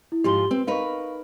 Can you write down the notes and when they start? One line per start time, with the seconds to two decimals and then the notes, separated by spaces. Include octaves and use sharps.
0.12 E4
0.24 G#2 F3 F4 G4 C6 G7
0.51 C4 B4
0.67 D#4 A#4 B4 F5 C#6